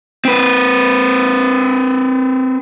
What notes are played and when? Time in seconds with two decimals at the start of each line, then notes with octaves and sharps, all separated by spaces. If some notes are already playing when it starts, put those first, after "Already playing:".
0.25 C4 B4